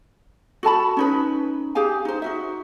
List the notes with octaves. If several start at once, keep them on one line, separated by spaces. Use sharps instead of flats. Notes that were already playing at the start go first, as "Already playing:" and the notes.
F#4 A4 A5 B5
C#4 D#4 B4
G4 G#4 F5 G#5
D#4 C5
D#4 F#4 E5